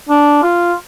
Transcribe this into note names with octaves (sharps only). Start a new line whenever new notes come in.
D4
F4